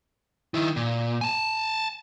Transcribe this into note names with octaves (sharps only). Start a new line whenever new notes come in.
D#3 E4
A#2
G#5 A5